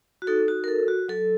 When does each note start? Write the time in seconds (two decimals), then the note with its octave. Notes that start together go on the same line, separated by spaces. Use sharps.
0.22 F#4
0.27 D#4 A4
0.48 F#4
0.64 A#4
0.68 F#4 A4
0.88 F#4
1.08 F#3 A4